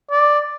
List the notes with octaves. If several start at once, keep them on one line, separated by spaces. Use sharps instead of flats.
D5